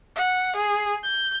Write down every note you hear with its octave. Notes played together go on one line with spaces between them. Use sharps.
F#5
G#4
G6